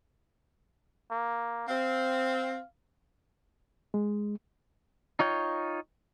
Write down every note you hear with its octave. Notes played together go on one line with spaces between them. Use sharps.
A#3
C4 F5
G#3
D#4 F4 C#5 G5